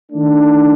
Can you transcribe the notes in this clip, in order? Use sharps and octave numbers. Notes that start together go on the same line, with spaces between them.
D#3 A3 D4